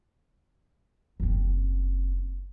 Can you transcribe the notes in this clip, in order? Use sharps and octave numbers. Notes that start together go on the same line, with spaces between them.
F#1 C4